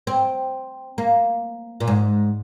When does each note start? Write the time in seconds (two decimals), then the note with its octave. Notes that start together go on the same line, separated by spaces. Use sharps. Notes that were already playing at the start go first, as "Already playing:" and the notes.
0.07 C4
0.98 A#3
1.80 A#2
1.88 G#2